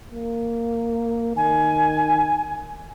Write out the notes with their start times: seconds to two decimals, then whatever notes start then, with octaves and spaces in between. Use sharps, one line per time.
0.11 A#3
1.36 D#3 G#5